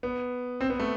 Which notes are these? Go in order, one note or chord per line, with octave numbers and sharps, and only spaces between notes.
B3
C4
B3
A3